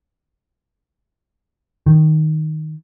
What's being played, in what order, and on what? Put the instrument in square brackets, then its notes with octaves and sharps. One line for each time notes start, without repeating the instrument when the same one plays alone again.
[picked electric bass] D#3